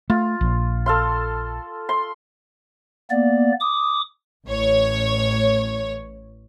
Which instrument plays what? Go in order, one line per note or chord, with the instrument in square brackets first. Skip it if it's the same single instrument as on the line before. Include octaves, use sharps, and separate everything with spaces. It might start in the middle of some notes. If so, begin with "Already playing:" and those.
[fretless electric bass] A3 [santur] F4
[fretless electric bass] A#1
[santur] A4 F5 C6
C6
[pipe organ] A#3 B3 D5
D6 D#6
[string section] A1 C#5